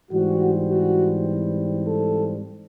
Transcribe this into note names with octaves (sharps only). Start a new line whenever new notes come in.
G#2 E3 G3 C4 F#4
F#4
A4